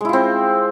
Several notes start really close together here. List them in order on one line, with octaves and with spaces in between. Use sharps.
G#3 E4 F4 C4